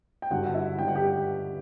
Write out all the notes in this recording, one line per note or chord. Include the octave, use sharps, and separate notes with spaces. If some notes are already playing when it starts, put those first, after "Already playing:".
G5
G1 G2 D3 F#4 F#5
F#5
E4 E5
G1 G2 D3 G5
F#5
G4 G5